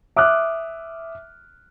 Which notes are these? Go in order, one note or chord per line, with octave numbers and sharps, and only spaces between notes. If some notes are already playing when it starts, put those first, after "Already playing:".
E5 D6 D#6 F6 F#6